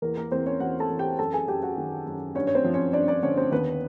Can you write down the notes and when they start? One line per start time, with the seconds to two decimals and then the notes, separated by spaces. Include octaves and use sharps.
0.02 E2 A#3 A#4
0.17 A#3 A#4
0.31 E2 C4 C5
0.46 C#4 C#5
0.60 E2 F#4 F#5
0.80 A4 A5
0.90 E2
0.99 G4 G5
1.19 F#2 A4 A5
1.33 G#4 G#5
1.48 F#2 G4 G5
1.63 F#4 F#5
1.77 D#3
2.06 F#2
2.35 G2 C#4 C#5
2.47 C#5
2.55 C4 C5
2.64 F3
2.74 C#4 C#5
2.93 G2 D4 D5
3.08 D4 D5
3.23 D3 C#4 C#5
3.37 C4 C5
3.52 D#2 B3 B4